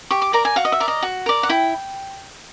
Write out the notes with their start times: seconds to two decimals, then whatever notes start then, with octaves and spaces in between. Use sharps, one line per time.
0.11 G4 C#6
0.22 D6
0.33 A#4 D5 A#5
0.45 G#5
0.56 F#4 F5
0.65 D#5
0.72 E5
0.80 A#4 D5
0.88 D#5
1.02 F#4
1.26 A#4 D5
1.43 F#5
1.49 E4 G5